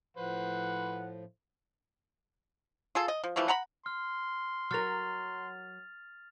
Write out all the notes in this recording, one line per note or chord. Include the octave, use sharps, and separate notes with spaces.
A2 F3 B4 C5 F#5
F4 G#4 A4
D#5
F3
E3 F3 G3 A3
F#5 A#5 B5
C6 F6
F#3 A#4 F6 A6 F7